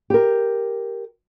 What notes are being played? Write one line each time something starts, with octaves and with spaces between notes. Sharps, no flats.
G4 A#4